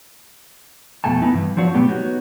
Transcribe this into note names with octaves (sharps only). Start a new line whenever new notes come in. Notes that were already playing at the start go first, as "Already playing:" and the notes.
F2 B2 A3 G#5 A5
B3 D#4 E4
G2 E3
F3 F#3 D4 F#4
B2 F#3 A3 B3 G4
B3 D#4 F#4 B4 C#5